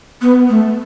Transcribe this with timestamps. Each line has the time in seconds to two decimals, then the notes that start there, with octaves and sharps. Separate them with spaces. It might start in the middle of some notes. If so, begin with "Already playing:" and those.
0.22 B3
0.49 A3